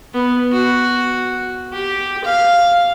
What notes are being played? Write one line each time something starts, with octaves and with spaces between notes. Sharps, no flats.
B3
F#4
G4
F5